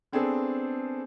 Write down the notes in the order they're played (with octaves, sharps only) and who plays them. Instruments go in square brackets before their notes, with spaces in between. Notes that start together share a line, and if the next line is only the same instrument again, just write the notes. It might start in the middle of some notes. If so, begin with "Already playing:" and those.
[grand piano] B3 C4 D4 G#4 A4